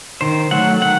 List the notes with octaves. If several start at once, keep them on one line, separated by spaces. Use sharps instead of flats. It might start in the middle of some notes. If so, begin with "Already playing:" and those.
D#3 C5
F#3 A3 F#5
D#3 F#5